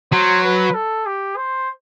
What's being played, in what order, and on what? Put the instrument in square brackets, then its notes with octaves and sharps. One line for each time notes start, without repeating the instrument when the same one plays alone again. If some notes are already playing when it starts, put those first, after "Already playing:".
[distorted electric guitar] F#3 [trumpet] C5
[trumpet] B4
A4
G4
C5